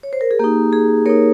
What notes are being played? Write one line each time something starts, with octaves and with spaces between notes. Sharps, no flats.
C#5
C5
A#4
G#4
A#3 D#4 G4
G#4
A#3 D#4 A#4 C#5